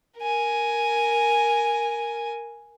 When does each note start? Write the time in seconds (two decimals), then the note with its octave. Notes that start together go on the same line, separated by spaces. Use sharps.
0.19 A#4 G#5